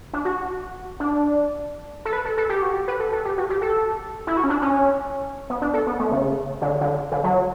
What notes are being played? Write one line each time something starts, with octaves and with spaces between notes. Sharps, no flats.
D4
F#4
D4
A4
B4
A4
A4
G4
F#4
G4
B4
A4
A4
G4
F#4
G4
A4
E4
F#4
C#4
D4
C#4
B3
D4
A4
B3
A3
C#3
D3
D3
D3
F#3